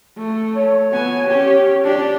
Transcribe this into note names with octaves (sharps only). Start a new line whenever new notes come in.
A3
C#5
B3 G#5
C#4 G4
D4 G4